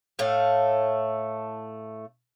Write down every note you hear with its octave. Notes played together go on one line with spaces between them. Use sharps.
A2 A3 F5